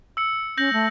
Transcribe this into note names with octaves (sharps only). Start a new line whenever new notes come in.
E6 C#7
C#4 G6 A#6 F#7
A3